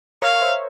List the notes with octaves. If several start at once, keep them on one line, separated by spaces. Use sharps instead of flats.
A#4 C#5 F5
C5 E5